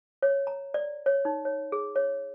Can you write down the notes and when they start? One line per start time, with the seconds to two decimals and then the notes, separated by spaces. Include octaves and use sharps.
0.22 C#5
0.47 A#5
0.74 D5
1.06 C#5
1.25 D#4
1.45 C#5
1.72 G#4
1.96 C#5